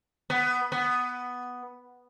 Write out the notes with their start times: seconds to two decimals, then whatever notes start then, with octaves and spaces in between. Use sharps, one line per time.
0.30 B3
0.72 B3